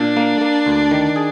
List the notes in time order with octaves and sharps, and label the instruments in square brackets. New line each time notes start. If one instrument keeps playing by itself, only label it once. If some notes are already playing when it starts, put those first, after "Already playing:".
Already playing: [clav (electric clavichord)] A#2 [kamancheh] D4
[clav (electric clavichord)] A#3
A#3
D2
D#3
G#4